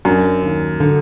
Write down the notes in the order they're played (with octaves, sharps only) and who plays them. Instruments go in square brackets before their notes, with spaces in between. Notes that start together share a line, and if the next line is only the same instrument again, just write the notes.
[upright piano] F#2 [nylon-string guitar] D4
[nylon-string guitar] D#2
D3